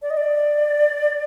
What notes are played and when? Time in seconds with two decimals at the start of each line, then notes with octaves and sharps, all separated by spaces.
0.02 D5
0.10 D#5
0.17 D5